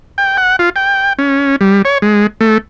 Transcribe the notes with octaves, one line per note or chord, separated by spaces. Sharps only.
G5
F#5
F4
G5
C#4
G3
C#5
G#3
A3